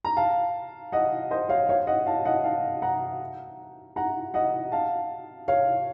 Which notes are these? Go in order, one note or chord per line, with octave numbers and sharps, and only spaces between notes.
A#5
F5 A5
D#5 F#5
C5 D#5
C#5 F5
C#5 F5
D#5 F#5
F5 A5
D#5 F#5
F5 A5
F#5 A#5
F#5 A#5
D#5 F#5
F5 A5
C#5 F5